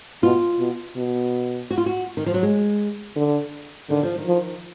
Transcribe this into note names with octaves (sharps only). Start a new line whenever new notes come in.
B2 F4
B2
B2
F#4
F4
F#4
D#3
F3
F#3
G#3
D3
D3 D#3
F3
D#3
F3